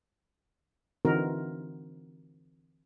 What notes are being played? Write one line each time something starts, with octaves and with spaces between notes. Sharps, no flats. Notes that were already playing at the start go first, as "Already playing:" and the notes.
D3 E3 C4 D#4 F#4 A#4